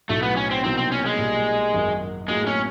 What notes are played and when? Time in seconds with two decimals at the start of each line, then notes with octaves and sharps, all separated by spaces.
0.09 B1 A2 F#3 A3
0.23 B3
0.37 C#4
0.51 C4
0.64 C2 B2 F#3 A#3 C4 D#4
0.77 C4
0.92 C#4
1.06 G#3
1.19 B1 A#2 G3 A#3
1.73 G#1 F#2 D#3
2.28 A2 F#3 G#3 A#3
2.47 C#4